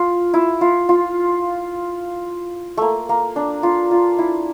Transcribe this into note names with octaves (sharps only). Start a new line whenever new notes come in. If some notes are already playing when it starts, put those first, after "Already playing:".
Already playing: F4
E4
F4
F4
A3 A#3
A#3
D4
F4
F4
E4